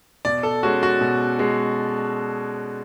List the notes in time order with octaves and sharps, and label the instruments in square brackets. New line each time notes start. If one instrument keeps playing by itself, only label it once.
[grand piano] B2 D5
A4
G#3 C#4 F#4
F#4
B2
G#3